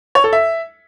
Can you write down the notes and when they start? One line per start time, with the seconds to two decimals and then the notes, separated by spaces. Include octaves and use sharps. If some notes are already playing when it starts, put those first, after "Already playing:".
0.15 C#5
0.24 A4
0.33 E5